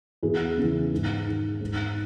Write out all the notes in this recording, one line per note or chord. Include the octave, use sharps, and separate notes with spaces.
E2 G#4
C#3 E3
G#2
D#3
G#2